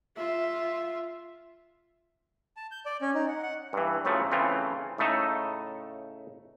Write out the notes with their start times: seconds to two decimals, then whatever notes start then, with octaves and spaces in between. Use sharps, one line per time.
0.17 F4 E5
2.57 A5
2.71 G6
2.86 D5
3.01 C#4
3.15 D#4
3.28 F#5
3.43 F#5
3.73 G2 E3
4.05 A2 C#3 F3 F#3 A3
4.31 C#3 E3 A3 C4 F4
4.98 A2 C#3 A3 D#4 A4